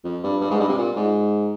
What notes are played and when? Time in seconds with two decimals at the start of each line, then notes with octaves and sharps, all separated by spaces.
0.04 F2
0.23 G2
0.41 G2
0.51 G#2
0.59 G2
0.69 C3
0.78 A#2
0.96 G#2